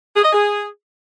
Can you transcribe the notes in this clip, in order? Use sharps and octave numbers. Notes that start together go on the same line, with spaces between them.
G#4
D#5
G#4